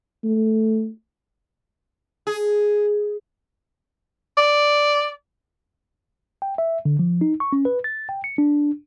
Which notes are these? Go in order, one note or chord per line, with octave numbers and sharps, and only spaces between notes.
A3
G#4
D5
G5
E5
D3
F3
D#4
C#6
C#4
B4
A6
G5
C#7
D4